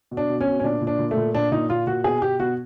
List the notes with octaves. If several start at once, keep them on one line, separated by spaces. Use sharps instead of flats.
B2
D4
B2
C#4
B2
C#4
A#2 D4
A#2
D4
A#2
A3
A#2
A#2 D4
A#2 D#4
A#2 F4
A#2 F#4
B2 G#4
B2 G4
B2 F#4